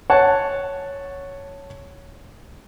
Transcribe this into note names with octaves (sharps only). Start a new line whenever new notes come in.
C#5 F#5 A5